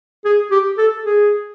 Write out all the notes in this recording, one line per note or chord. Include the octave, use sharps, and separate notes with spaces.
G#4
G4
A4
G#4